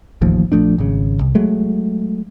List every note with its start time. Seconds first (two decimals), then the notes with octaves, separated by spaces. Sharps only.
0.21 D1 A1 D#2 F3
0.52 A#1 F3 A3 D4
0.78 G#1 C#3
1.21 C2
1.35 F#3 G#3 A3